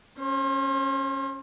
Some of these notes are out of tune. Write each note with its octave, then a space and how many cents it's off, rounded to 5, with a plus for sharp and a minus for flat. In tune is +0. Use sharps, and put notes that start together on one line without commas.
C#4 -10 C5 +40